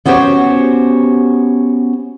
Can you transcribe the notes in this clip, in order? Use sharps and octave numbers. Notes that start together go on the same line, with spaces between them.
B3 C#4 F#4 G4 C5 C#5